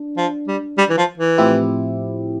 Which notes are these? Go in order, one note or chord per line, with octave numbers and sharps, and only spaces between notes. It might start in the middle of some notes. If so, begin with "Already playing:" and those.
Already playing: D4
F3
G3
G3
E3
F3
E3
A2 F3 C4 E4 G4